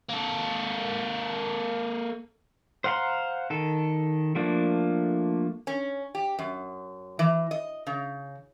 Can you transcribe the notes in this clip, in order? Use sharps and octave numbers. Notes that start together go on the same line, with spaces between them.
A#3 A4
C5 F5 F#5 A#5 C6
D#3 A4
F3 A3 A#3 D4
C#4
G4
F#2
E3
D#5
C#3